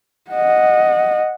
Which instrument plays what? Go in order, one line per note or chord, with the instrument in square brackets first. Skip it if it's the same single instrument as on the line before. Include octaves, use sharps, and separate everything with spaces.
[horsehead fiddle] D#5 F#5